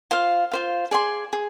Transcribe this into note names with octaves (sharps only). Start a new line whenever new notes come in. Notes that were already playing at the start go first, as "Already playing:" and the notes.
F4 C5 F5
F4 C5 F5
G#4 D5 G#5 C6
G#4